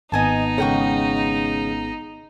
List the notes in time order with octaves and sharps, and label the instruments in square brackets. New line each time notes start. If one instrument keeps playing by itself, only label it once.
[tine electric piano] G#1 B3 [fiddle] D#4 [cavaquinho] D#5 G#5 A5
[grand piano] C#3 G#3 [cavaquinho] F#5 G5 C#6